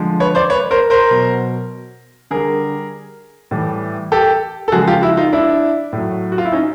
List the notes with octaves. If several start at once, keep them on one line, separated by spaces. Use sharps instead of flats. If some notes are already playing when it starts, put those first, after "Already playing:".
Already playing: D3 F3 G#3
B4 C#5
C5 D5
B4 C#5
A#4 C5
A#4 C5
B2 F#3
D3 G3 G#4 A#4
A2 E3 G3
G4 A4
A4
C#3 F3 G#3 F#4 G#4
F4 G4
E4 F#4
D#4 F4
D4 E4
A2
F#3
F#4
F4
E4
C#4 D#4